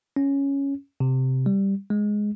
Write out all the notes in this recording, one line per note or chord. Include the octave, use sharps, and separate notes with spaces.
C#4
C3
G3
G#3